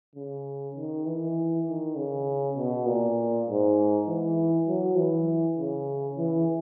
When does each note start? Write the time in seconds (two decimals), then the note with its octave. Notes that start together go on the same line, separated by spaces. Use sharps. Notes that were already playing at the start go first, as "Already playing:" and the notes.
0.16 C#3
0.76 D#3
1.06 E3
1.67 D#3
1.97 C#3
2.57 B2
2.86 A#2
3.48 G#2
4.07 E3
4.68 F#3
4.97 E3
5.58 C#3
6.17 E3